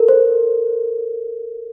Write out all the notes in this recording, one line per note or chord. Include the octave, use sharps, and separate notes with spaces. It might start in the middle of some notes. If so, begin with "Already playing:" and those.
Already playing: A4 A#4
C5